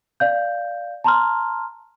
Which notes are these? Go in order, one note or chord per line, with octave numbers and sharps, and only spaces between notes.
D5 F5 G6
A5 A#5 C6 F6